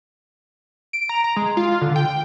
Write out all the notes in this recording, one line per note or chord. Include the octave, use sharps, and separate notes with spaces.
D7
A#5
A#5
G#3
F4
D3
G5